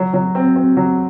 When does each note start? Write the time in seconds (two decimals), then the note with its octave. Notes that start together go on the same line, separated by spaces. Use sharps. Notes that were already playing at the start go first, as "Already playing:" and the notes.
Already playing: F#3
0.14 F#3
0.35 C4
0.56 C4
0.77 F#3